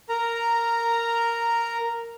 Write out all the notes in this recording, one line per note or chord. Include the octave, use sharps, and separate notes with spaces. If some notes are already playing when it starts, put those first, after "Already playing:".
A#4 A#5